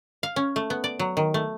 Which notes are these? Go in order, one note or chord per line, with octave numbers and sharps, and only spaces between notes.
F5
C#4
A3
B3
D5
F#3
D#3
A3